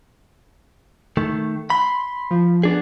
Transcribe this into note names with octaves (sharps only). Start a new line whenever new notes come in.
D#3 A3
B5 C6
F3
B3 D4 G#4